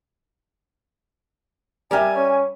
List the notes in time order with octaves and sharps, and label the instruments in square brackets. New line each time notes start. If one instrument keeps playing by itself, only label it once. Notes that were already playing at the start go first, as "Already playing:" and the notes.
[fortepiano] G3 E5 [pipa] G4 A#4 D5 [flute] G#5
[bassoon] C#4